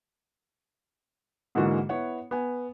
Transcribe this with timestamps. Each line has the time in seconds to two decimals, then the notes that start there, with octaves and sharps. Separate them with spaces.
1.55 G#2 D3 E3 G#3 A#3 F#4
1.89 B3 E4 C#5 F#5
2.31 B3 G#5